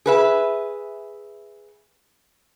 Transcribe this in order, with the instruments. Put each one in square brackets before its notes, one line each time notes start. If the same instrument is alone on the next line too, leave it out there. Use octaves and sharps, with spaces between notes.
[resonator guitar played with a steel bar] G#4 B4 E5